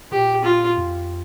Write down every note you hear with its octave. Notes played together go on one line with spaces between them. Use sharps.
A#2 G4
F4
F2